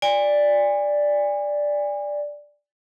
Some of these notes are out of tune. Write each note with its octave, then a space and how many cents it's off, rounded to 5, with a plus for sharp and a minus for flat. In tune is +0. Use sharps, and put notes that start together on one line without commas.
D5 +0 G#5 -35